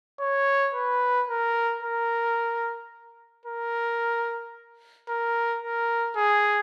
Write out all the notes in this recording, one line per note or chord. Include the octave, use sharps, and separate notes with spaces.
C#5
B4
A#4
A#4
A#4
A#4
A#4
G#4